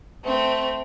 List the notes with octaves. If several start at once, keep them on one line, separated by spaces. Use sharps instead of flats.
A3 C4